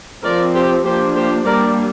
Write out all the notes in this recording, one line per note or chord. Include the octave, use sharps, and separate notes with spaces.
F3 C4 A#4 D5
G4 C5
F3 A#3 D4 G4 C5
G4 C5
G3 A#3 D4 A#4 D5